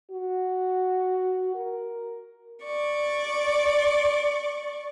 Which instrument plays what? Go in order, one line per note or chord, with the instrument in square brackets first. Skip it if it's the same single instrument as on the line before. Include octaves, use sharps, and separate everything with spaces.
[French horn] F#4
A#4
[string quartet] D5 C#6